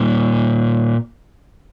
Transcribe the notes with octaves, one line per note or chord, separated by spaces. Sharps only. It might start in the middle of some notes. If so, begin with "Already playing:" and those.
Already playing: A#2 G3